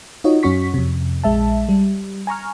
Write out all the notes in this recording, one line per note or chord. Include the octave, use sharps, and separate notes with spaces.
D#4 F4 F#4 C#5 D#5
F#2 C#4 F#4 C#6 B6
F2 C3
A#1 G#3 E5 A5
G3
G#5 A#5 C#6 F6